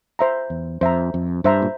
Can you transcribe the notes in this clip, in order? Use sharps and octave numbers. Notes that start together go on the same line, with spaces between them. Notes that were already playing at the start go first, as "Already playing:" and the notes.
C5 E5 A#5
E2
F2 C5 E5 A#5
F2
G2 C5 E5 A#5
A#2